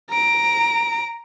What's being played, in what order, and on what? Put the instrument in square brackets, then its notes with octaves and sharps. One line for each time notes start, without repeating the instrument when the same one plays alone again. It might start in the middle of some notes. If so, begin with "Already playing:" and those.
[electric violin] A#5 D7